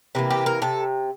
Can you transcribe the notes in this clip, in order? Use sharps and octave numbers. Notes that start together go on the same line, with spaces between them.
C3 E3 A#3
G4
A#4
C3 A4